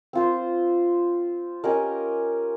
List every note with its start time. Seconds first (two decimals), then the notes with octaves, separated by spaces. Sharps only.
0.13 C4 F4 C5
1.64 C#4 G4 A#4 D#5